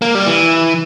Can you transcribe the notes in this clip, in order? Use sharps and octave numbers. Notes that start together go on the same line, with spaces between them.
A#3
G3
E3